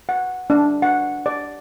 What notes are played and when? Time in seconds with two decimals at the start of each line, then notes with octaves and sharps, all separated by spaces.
0.09 F#5
0.50 D4
0.82 F#5
1.26 D5